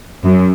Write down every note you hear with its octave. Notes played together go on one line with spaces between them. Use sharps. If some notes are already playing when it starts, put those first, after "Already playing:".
F#2